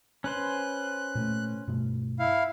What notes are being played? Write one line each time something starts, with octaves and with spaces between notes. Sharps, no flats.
C#4 B4 C5 F#6
A#2 A3
G2 B2 A3
E4 F5